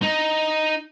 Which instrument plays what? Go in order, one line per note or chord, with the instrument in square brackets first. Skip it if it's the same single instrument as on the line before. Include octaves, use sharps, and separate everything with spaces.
[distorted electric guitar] D#4